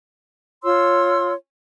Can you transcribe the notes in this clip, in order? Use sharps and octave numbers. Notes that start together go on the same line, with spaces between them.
F4 C#5 C6 E6